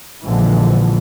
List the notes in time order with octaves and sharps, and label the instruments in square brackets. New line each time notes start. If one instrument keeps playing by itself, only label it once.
[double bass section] A#1 A#2 D3 E3 F3 G#3